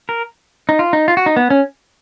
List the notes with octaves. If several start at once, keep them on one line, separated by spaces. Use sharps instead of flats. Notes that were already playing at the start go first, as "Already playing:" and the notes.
A#4
D#4
F4
D#4
F4
F#4
D#4
B3
C#4